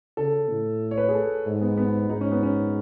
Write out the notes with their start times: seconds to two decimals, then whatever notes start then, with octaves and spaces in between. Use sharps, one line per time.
0.17 C#3 A4
0.50 A2
0.91 C#5
0.98 B4
1.09 G#4
1.14 A4
1.46 G#2
1.61 B3
1.77 B3
2.09 G#2 D#4
2.21 C#4
2.32 B3
2.43 C#4